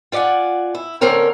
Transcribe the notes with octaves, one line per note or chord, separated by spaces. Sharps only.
F4 D5 D#5 F#5 G#5
E4
D3 A#3 C4 C#4 A#4 C#5